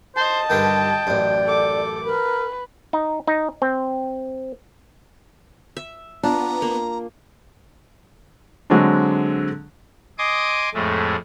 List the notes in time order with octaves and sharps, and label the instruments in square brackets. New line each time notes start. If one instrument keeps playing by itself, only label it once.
[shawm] C5 [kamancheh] D#5 A5
[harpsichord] G2 D3 D#3 [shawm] G5
[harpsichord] A1 F#2 [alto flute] D5
[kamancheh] A4 D6
[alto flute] A#4 [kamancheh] B4
[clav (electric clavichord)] D#4
D#4
C4
[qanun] E5
[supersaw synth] B3 [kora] D4 [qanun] F4 [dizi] A#5
[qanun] A#3
[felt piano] D3 F#3 G#3 C4 D4
[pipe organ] D#5 G#5 C6 D6 D#6
F2 A2 G#3 A3